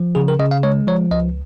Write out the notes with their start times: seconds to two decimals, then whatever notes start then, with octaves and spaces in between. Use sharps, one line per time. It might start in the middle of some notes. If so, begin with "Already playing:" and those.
Already playing: F3
0.15 C#3 G#4
0.28 A#4
0.39 C#3 D#5
0.51 F5
0.63 G#3 C#5
0.87 F3 C#5
1.11 C#2 D#5